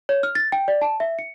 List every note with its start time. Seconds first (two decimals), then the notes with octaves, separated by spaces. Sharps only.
0.09 C#5
0.23 F6
0.35 A6
0.52 G5
0.68 D5
0.81 A5
1.00 E5
1.19 C#7